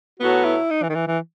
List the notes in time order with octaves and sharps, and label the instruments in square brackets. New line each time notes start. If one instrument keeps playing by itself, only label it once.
[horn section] A2 F#3 B3 [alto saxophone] F#4
[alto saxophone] E4
D#4
E3
D#3
E3
E3